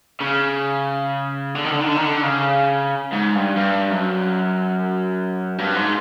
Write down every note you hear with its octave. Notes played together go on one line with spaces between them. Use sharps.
C#3
D3
D#3
D3
D#3
D3
D#3
D3
C#3
G#2
G2
G2
F#2
G2
G#2